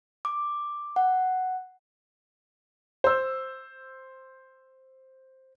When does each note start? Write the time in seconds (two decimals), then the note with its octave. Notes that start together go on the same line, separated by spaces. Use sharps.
0.25 D6
0.96 F#5
3.04 C5 E6